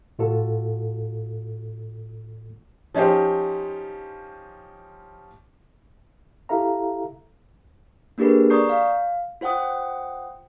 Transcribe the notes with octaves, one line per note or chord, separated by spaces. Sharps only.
A2 F4 F#4 A4
F3 C#4 D#4 G4 C5
E4 G4 A4 E5 F5 A#5
A#3 D4 G4 G#4 A#4 B4
D5 A#5 C#6 D#6 G6 C7
F5
F4 C5 F#5 G5 D#6